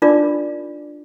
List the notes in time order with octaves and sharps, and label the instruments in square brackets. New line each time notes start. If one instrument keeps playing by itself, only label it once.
[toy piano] D4 D#4 F4 A#4 D5 D6